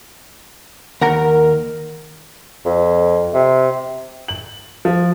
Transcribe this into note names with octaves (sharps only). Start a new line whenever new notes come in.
D#2 A#4 F#5 A#5
F2
C3
F#7
F3